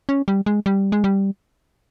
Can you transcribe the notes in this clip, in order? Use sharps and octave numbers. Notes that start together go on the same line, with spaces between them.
C#4
G3
G#3
G3
G#3
G3